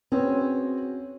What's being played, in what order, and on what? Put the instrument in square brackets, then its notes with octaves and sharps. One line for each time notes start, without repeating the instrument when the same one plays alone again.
[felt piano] C4 B4 [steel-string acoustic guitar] C#4 F#4 G#4